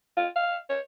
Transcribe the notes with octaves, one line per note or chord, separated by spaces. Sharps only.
F4
F5
C#5